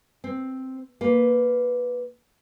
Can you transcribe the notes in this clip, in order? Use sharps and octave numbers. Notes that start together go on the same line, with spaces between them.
C4
A#3 B4